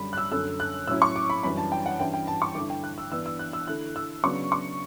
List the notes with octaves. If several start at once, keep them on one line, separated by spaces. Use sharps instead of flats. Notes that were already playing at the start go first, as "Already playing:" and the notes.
Already playing: F#2 D3 G3 D4 B5
F#6
E6
F#2 D3 A3 E6
F#6
A2 F#3 C#4 E4 E6
C#6
D6
B5
F#2 E3 G3 D4 B5
A5
G5
F#5
G2 E3 G3 C#4 E4 G5
G5
A5
C#6
G2 D3 A3 E4 D6
G5
F#6
E6
G2 E3 B3 D4 E6
E6
F#6
E6
D3 A3 E4 F#6
E6
C#3 F#3 B3 D4 C#6
C#6